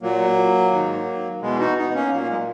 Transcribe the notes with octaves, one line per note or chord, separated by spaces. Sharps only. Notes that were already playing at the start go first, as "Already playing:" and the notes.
A#2 F#3 A#3
G#2 D#3
E2 B2 G#3
D#4 F#4
B3 D#4
A#3 C#4
A#2 F#3 A#3
G#3